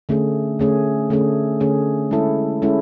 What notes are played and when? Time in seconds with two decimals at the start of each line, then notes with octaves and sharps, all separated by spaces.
0.09 D3 A3 C#4 G#4
0.59 D3 A3 C#4 G#4
1.10 D3 A3 C#4 G#4
1.60 D3 A3 C#4 G#4
2.11 G#3 C#4 E4 A4
2.62 G#3 C#4 E4 A4